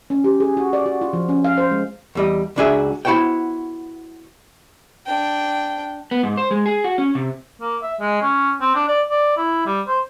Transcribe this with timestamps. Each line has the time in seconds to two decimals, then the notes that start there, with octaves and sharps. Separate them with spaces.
0.10 C#4
0.24 G4
0.40 G#4
0.57 F#4
0.73 D5
0.86 F#4
1.01 F4
1.13 F3
1.29 C#4
1.45 F5
1.58 C5
1.71 G#3
2.15 E2 G3 D#5
2.56 C#2 F#3 D4 F#4 G#4 E5
3.05 B3 E4 F#4 C5 C#5 G5
5.06 D4 G5
6.11 B3
6.23 G#2
6.37 C5
6.51 G#3
6.66 G#4
6.84 F#4
6.98 C#4
7.15 C3
7.61 A#3
7.82 E5
8.00 G#3
8.22 C#4
8.61 C4
8.75 D4
8.88 D5
9.09 D5
9.37 E4
9.66 G3
9.88 C5